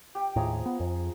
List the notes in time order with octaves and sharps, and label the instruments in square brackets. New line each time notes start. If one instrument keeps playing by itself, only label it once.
[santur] G4 G5
[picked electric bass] D#2 A2 [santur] F3 G#4 A#5
[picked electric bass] B3
F2